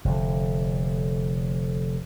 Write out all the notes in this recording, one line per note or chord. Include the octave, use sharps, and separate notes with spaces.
F1 D3